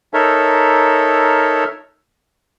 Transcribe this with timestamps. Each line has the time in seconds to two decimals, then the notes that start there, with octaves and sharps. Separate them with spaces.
0.14 D#4 A4 A#4 C#5 E5